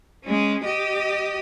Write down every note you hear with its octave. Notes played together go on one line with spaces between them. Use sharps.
G#3 C#4
G4 D#5